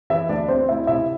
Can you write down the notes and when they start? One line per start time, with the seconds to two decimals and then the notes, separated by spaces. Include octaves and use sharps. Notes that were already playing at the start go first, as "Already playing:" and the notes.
0.10 E3 E4 E5
0.29 D2 D4 D5
0.48 D2 C4 C5
0.69 D2 E4 E5
0.87 C3 E4 E5